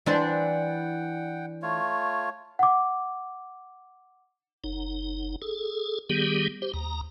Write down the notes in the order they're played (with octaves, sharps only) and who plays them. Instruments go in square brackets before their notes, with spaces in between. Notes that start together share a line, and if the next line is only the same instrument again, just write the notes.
[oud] E3 D4 C5 [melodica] F#5 G5
[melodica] A3 F4 C#5
[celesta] F#5 D6
[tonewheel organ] F#1 D#4
G#4 A4
D#3 G3 B3 G4 G#4
G4 C5
D#2 A#5